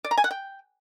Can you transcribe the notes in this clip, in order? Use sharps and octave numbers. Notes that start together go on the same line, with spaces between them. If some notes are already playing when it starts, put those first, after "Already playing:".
D5
A#5
G#5
F#5
G5